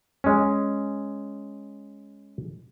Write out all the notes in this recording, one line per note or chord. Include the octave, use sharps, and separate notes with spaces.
G#3 C#4